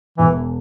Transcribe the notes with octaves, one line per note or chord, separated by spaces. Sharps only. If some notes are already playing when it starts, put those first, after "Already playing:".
E1 E3